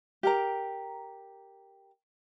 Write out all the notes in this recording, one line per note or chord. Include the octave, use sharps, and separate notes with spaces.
G4 A#4 A#5